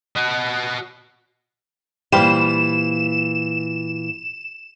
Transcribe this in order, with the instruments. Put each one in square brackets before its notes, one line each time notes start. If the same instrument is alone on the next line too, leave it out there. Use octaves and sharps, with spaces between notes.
[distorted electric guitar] F#4 D#5
[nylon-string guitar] A#2 E3 [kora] G3 C5 F5 [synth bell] E7